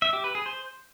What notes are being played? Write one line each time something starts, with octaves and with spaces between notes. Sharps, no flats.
E5
G4
B4
G#4
C5